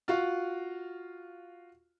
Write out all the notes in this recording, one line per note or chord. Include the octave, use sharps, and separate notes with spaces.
F4 F#4 F5